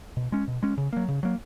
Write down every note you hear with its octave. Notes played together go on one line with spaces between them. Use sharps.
B2
G#3 C#4
B2
G#3 C#4
C#3
F#3 A#3
C#3
F#3 A#3